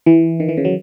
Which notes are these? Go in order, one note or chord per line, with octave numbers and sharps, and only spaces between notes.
E3
D#3
E3
C#3
F#3